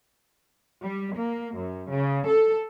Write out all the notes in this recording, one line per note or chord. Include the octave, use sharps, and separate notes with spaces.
G3
A#3
F#2
C#3
A4